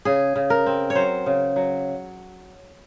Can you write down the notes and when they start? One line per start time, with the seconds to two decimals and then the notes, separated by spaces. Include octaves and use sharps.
0.05 C#3 G#4
0.36 C#3
0.50 A#4
0.66 C4
0.90 C#5
0.95 F#3 C5
1.26 C#3
1.56 F#3